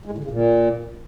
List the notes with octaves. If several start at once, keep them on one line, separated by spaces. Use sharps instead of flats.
G#3
A2
D3
C#3
A#2